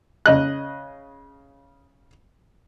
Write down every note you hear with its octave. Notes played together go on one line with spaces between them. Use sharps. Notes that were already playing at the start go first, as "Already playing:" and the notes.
C#3 D#5 F#6